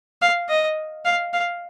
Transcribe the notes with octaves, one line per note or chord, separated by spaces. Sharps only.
F5
D#5
F5
F5